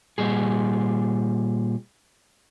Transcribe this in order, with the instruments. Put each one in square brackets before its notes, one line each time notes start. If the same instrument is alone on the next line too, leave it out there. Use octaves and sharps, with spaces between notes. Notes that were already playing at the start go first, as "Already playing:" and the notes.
[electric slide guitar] A#2 G3 G#4